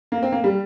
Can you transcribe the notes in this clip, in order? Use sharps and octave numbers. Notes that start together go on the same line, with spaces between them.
A#3
C4
A#3
G3